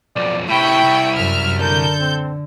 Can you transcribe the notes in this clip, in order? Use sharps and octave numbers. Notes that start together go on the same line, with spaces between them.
B1 F2 D5
A2 C3 E4 G5 B5 C#6
C2
F#2 E5 F6
D3 A4 A#4 G6
C4